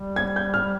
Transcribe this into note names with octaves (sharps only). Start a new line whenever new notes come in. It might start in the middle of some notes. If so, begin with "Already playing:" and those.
Already playing: G3
G#6
G6
F6